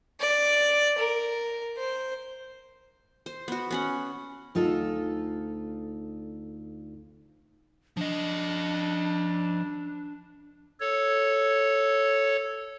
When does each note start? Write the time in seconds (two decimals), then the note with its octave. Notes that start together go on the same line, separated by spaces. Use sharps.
0.20 D5
0.98 A#4
1.77 C5
3.26 C5
3.48 B3 F#4
3.71 B3 C#4 F#5
4.55 D2 D#4 F4 A4
7.97 F3 D4 D#5
10.80 A4 C#5